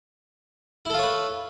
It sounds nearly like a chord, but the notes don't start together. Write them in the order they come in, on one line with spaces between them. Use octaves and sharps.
E4 A4 F4 C#5 B4